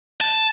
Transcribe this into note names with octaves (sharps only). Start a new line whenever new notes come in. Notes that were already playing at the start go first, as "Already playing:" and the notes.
A5